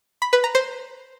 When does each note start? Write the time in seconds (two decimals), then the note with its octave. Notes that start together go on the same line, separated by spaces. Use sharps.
0.22 B5
0.33 B4
0.44 A#5
0.55 C5